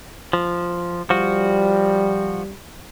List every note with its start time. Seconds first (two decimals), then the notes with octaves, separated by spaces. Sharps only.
0.33 F3
1.10 F3 G3 F#4